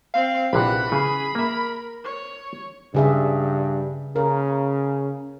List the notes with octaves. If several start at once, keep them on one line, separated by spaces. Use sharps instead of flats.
C4 F5
A#1 C3 E3 F#5 B5
C#3 G#4
A#3 A#4 E5
C#5
G2 C#3 G#4 E5
C#3 A#4